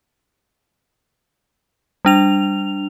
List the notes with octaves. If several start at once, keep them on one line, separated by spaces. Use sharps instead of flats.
G3 D4 F7